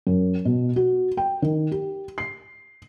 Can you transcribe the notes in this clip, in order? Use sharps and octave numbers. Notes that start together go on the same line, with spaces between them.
F#2
B2
F#4
G5
D#3
G4
C7